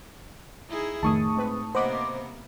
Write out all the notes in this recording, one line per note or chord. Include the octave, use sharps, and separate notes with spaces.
D#4 E4 G#4
F2 A2 D#3 A3 D#4 A5 C#6 D#6
G#3 C4 B4
C3 A#3 B3 C5 D#5 F#5 B5 D6